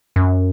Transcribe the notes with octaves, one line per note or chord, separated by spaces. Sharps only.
F#2